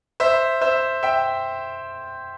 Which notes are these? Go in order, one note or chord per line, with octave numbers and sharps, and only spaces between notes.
C5 E5
C5 E5
E5 G5